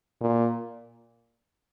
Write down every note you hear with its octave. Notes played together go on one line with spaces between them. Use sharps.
A#2